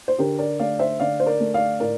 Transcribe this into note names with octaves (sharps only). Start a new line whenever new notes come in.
C5
D3 G4 A#4
A#4 D5
A3 D5 F5
C5 E5
D3 D5 F5
C5
A#4 D5
A3
D5 F5
A2 A#4 D5